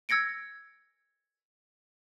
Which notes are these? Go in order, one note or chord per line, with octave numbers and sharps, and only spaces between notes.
E6 G#6 A#6 C#7 D7